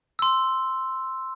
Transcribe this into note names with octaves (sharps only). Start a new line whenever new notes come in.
C6 E6